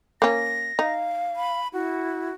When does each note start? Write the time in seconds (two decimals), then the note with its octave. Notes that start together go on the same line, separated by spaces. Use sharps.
0.22 A#3 C#4 A#6
0.79 D#4 F5
1.36 B5
1.74 E4 F#4